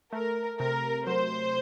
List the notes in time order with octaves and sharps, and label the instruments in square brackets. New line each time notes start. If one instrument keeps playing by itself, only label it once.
[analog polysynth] A3 [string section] A#4
[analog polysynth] C3 [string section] A#4
[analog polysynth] F#3 [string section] C5